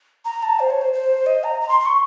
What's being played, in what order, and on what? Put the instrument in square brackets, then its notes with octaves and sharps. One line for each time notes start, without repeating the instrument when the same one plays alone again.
[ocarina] A#5
A5
C5
C#5
C5
C5
D#5
A#5
A#5
C6
C6
C#6